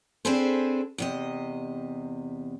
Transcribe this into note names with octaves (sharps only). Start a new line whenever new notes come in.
C4 D4 G#4 A4 B4 C5
E2 C3 D#5